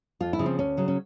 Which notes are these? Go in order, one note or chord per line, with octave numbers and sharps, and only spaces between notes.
F2 F4
E4
C#3 F3
C4
D2 C#4
C#3 F#3
C#4